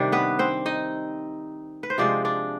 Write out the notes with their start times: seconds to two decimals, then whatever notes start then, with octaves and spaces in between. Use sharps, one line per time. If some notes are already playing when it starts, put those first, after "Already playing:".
Already playing: C3 D#3 G3 D4 D5
0.12 B3 B4
0.39 C4 C5
0.66 D#4 D#5
1.83 B4
1.90 C5
1.98 C3 F3 G#3 D4 D5
2.25 D4 D5